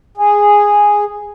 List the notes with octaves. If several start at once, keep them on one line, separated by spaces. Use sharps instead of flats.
G#4